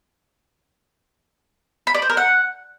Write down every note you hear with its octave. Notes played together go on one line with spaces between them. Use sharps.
B5
D5
C5
A#4
F#5